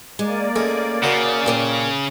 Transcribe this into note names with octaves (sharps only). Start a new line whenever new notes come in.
G#3 A#3 D5
G#3 A3 C#4
C#3 F#4 A#4 C5
A#2 C#4 A#4 G5